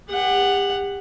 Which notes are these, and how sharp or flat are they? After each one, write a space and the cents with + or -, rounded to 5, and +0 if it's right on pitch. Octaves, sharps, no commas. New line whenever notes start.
G4 +35 F#5 +0